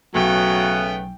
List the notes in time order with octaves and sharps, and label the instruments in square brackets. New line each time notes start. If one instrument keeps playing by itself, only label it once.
[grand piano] B1 G#5 [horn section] C#3 A3 B3 [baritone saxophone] F#3 [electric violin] G5